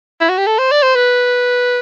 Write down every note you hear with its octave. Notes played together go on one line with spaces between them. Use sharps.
E4
F#4
G4
A4
C5
D5
C5
B4